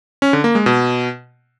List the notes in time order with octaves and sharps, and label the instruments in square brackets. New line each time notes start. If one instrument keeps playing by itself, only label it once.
[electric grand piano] C#4
D3
A#3
G#3
B2